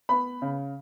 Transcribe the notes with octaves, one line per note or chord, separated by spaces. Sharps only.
B3 B5
C#3